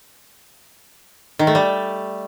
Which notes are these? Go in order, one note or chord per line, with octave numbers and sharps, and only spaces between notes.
D#3
A3
G3